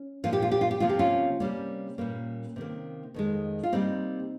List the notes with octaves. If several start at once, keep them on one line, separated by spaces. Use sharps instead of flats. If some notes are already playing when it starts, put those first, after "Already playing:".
Already playing: C#4
A#2 F3 A#3 F4
G4
F4
G4
F4
G4
C3 F3 A#3 F4
G4
C#4 F4
C3 G3 A#3 C#4
A#2 G3 A#3
C3 D#3 A#3
F2 D#3 G#3
F4
C3 G3 A#3 C4 D#4